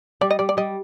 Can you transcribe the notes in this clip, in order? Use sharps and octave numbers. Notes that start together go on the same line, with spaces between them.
G3 D5
D#5
G3 D5
D5
G3 D#5